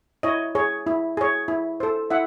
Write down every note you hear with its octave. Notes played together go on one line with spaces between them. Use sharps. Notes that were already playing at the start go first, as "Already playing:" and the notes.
E4 C#5 D#5
G#4 C#5
E4
G#4 C#5
E4
A4 C5
E4 E5 F#5